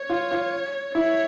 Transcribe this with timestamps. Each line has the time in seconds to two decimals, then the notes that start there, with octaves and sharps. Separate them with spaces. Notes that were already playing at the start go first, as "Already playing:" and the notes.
Already playing: C#5
0.10 F4
0.31 F4
0.95 E4 C#5